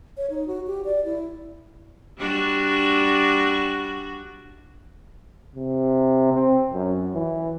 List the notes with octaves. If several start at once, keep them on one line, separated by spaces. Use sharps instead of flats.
C#5
D#4
F#4
G4
D5
E4
G3 D4 F#4
C3
C4
F#2
E3